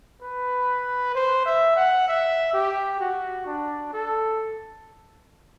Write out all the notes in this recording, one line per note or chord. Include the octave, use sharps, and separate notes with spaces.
B4
C5
E5
F#5
E5
G4
F#4
D4
A4